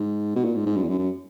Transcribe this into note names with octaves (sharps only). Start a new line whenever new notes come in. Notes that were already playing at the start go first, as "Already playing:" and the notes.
Already playing: G#2
B2
A#2
G#2
G#2
F#2
E2
F#2
F#2